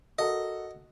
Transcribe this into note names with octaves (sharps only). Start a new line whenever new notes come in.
F#4 A4 A#4 D#5